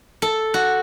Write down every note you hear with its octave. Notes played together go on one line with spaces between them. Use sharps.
A4
F#4